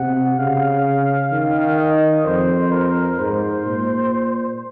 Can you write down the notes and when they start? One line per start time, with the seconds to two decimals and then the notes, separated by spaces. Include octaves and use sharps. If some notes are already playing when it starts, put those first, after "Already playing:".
Already playing: C3 F#5
0.38 C#3 F5
1.32 D#3
1.79 D#5
2.25 F2 C5
2.72 A#4
3.19 G#2 C5
3.65 A#2